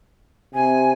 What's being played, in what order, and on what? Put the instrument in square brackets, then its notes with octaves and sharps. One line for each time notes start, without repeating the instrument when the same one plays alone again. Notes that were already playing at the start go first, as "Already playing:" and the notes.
[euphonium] C3 [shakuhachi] G#5